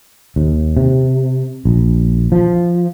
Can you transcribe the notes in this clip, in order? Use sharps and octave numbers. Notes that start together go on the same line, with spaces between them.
D#2
C3
A#1
F3